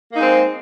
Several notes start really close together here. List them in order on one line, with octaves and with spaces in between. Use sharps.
A#3 D#4 G#3 C4